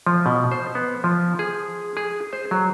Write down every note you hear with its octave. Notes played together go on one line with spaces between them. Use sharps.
F3
B2
C5
B3
F3
G#4
G#4
C5
F#3